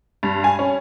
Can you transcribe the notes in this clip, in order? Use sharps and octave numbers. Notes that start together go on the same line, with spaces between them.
G2
G#5
C#4